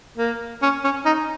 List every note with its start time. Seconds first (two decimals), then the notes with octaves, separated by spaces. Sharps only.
0.18 A#3
0.62 C#4
0.84 C#4
1.05 D#4